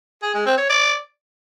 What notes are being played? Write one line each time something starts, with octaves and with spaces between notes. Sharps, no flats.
G#4
G#3
C4
C#5
D5